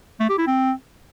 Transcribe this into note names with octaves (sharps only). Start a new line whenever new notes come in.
A3
G4
E4
C4